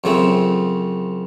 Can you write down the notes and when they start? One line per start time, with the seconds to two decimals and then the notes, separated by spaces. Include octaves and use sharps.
0.04 F#2 C#3 F3 A3 C4